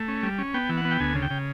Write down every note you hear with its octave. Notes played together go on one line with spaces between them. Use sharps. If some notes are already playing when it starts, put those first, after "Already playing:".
Already playing: A3
C#4
G3
C#4
B3 G5
E3
F#5
B3
G5
D2 G#5
C#3
G5
C#3